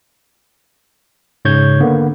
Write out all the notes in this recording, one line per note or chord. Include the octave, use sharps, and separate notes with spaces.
G#2 C#3 C#5 G6 G#6
D3 A#3 B3